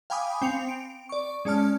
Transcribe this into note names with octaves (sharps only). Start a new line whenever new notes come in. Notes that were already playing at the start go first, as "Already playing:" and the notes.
F5 G5 G#5 B5 D6 D#6
C4 G5 C#7 F7
D7
D5 C#6
G#3 C#4 D5 A5 F6